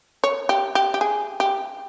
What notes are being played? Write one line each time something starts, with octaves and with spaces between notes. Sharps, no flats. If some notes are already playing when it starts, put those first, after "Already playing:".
C#5
G4
G4
G4
G#4
G4